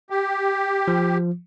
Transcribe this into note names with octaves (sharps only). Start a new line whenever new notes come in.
G4
F3